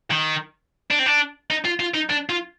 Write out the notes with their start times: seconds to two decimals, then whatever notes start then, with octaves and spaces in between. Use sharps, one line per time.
0.11 D#3
0.91 D4
0.99 C4
1.06 D4
1.50 D#4
1.65 F4
1.80 F4
1.94 D#4
2.10 D4
2.29 F4